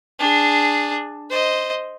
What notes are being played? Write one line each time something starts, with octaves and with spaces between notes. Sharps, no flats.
D4 G#4
C5 D#5